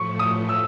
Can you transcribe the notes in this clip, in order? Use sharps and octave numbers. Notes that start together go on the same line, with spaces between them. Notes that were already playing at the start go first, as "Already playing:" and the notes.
Already playing: A2 F3 A3 C#6
D#6
E6